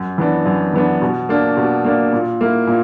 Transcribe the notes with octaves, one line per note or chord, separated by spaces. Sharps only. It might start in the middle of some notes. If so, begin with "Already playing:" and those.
Already playing: F#2
E3 B3 D4
F#2
E3 B3 D4
B2
A#3 D4
B2
A#3 D4
A#2
A#3 E4
A#2